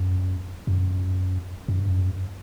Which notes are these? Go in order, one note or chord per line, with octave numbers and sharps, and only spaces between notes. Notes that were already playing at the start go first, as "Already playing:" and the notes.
Already playing: F#2
F#2
F#2
G2
F#2